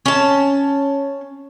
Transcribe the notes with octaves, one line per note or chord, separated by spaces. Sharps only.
C#4 A5